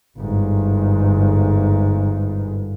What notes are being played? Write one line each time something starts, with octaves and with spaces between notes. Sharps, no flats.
G1 G#2